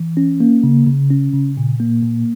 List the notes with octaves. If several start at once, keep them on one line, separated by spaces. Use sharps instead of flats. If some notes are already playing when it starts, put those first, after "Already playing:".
Already playing: E3
C#4
A#3
C#3
C#3
C#4
C#3
A#2
A#3
A#2